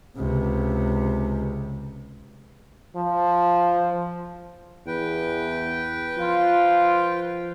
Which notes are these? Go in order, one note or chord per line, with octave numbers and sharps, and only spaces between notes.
C#2 C3
F3
E2 B4 G5
F3 F4